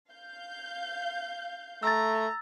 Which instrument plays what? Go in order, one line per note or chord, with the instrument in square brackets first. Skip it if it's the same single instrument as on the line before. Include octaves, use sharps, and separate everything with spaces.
[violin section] F5 G6
[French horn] A3 [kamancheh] A#5 [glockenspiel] E6 A6